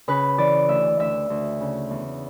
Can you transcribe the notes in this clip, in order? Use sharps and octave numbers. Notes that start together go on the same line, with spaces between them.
C#3 B4
E3 D5
D2 E5
D2 E5
D2
C#3
E2